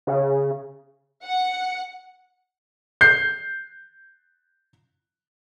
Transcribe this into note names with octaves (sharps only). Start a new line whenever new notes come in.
C#3
F#5
G6 C7